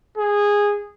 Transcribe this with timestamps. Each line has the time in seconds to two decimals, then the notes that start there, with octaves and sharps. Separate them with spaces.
0.18 G#4